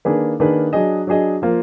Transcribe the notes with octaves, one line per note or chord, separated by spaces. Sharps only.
D#3 A#3 D4 G#4 B4
D#3 A#3 D4 G#4 B4
F#3 D4 G#4 D#5
F#3 D4 G#4 D#5
F3 A#3 F4